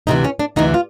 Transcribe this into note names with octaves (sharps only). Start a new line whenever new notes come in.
D2 C3 E3 D#4
C#4
D4
D2 C3 E3 D#4
F4